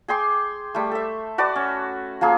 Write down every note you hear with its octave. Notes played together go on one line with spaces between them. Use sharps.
G#4 G5 C6 D6
G3 A3
A4 E5
F#4 B4 D5 A5
C#4
F3 A#3 G#4